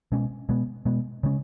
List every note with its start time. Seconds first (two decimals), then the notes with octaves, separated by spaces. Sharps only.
0.12 B2 G#3 C#4
0.49 B2 G#3 B3
0.85 B2 G#3 B3
1.23 C#3 G#3 C#4